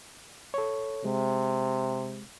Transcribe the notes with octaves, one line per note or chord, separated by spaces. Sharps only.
A4 C#5
C3 G#3